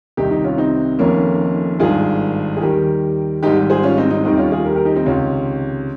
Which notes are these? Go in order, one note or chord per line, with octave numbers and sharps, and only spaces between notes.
C2 C3 D#3 D#4 G4
D#4 G4
C#4 F4
C4 D#4
F1 F2 D#3 A#3 C#4
G#1 G2 D#3 F4 G#4
G#4
D#2 D#3 G3 G4 A#4
G#1 G#2 G3 D#4 G4
G#4 C5
C#4 F4
C4 D#4
C4 D#4
F1 D#2 D#3 G3 C4 D#4
C#4 F4
F4 G#4
G4 A#4
G4 A#4
D#4 G4
C4 D#4
C#2 C3 D#3 C#4 F4